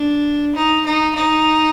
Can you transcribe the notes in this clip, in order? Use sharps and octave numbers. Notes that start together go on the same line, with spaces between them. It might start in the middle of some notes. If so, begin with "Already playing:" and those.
Already playing: D4
D#4
D#4
D#4